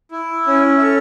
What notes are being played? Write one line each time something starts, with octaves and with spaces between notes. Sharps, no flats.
E4
C#4
E5
A4 C#5